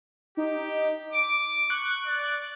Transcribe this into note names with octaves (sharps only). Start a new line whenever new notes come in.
D#4 G4
D6 D7
C#6 F#6
D5